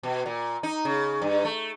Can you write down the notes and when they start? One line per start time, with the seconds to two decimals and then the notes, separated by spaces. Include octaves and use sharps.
0.03 B2
0.26 A#2
0.63 D#4
0.85 C#3
1.22 G2
1.45 A3